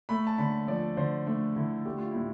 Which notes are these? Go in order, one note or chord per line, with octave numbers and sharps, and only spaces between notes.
A3 B5
A5
D3 B5
F3 D5
D3 C5
A3 D4
D3 E4
A3 G4
F4
A2 E4